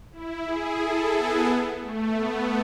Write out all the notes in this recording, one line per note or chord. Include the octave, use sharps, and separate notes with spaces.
E4
G#4
A4
B3
B3
A3
B3